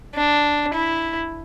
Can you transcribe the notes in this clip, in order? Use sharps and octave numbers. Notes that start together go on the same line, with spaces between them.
D4
E4